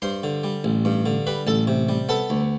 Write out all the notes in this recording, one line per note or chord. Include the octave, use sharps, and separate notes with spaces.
G2 C5 C6
D3
G3
A1
G2
D3
G3 B4 B5
A1 A4 A5
C3
G3
B3 A4 A5
D2